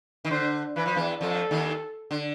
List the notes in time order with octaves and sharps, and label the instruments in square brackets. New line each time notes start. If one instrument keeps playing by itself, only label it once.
[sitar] D#3
[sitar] D3 [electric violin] C5
[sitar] E3 [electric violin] B4
[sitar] F3
E2 E3
[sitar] F2 F3 [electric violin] A4
[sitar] D#2 D#3
D3